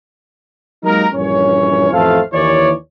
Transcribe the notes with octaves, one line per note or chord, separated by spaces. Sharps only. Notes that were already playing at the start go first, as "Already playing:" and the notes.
F#3 G#3 A#3 D#4 G4 A#4
A#1 G2 E3 C#4 C#5
A1 F2 A3 A4 C5 F5
D#2 E3 C#5 D5